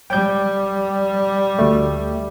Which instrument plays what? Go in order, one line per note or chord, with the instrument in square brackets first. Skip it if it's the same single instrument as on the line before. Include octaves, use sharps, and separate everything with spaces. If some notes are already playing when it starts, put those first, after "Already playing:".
[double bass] G3 [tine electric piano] G5 G6
[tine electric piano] D2 A3